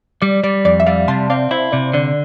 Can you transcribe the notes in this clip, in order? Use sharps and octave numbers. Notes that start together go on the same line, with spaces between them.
G3 D5
G3 D5
F2 D5
E5
G3 D5 F5
C3 A5 C6
C4 D5 F5
E4 C5 E5
C3 D5
D3 D5